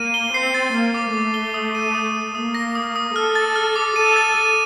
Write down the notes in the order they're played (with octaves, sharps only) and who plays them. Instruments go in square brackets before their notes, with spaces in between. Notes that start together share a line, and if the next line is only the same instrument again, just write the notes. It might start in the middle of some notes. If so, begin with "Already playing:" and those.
Already playing: [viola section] A#3 [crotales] D#7
[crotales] G7
[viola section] C4 [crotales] C7
[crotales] A6
[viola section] A#3 [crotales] A6
[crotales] D6
[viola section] A3 [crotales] D6
[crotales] G7
D#6
D#7
D#6
D#6
[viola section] A#3 [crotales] D#6
[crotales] A#6
D#6
D#6
[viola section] A4 [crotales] F6
[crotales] A6
F6
D6
[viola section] A4 [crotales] D#7
[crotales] A6
D#7